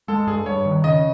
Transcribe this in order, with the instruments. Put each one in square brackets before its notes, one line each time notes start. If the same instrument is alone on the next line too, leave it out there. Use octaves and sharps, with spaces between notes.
[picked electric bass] G#3 [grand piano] A4
[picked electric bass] G2 [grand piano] G#4
[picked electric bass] G2 [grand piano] C#5
[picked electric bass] D#3
[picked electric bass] C#3 [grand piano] D#5